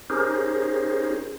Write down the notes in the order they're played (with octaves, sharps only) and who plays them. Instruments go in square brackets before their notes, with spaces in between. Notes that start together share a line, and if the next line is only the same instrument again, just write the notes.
[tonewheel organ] C#4 D#4 G4 G#4 A#4 C5